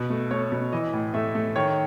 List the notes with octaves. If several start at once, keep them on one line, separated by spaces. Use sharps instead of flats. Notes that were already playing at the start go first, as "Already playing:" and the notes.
Already playing: B2
A3
A3 C#5
B2
E3 D#5
A2
A3 E5
A3
D#3 C#5